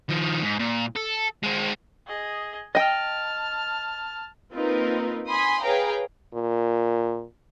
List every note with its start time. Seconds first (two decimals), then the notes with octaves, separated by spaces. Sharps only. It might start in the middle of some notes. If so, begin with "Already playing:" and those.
0.09 D#3 F3
0.42 G#2
0.59 A#2
0.96 A4
1.43 G#3 C4
2.07 G#4 D#5
2.75 D#5 G5 A5 F6
4.54 A#3 C4 D#4 F4 A#4 B4
5.28 G#5 B5 C6 D#6
5.63 G#4 B4 C#5 F5 G5 A#5
6.34 A#2